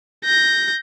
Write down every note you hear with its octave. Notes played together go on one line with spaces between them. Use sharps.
G6 A#6